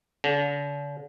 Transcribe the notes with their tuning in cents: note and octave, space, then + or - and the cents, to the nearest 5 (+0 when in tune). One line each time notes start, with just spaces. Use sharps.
D3 -40